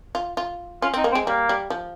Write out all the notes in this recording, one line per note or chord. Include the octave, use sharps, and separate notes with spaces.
F4
F4
C#4 F4
C4 D#4
A#3
C4
G#3
G3 A#3
G3
F3